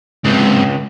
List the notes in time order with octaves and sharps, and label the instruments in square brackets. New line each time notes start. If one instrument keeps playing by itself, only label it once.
[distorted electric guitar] C#2 [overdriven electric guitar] G#2 C3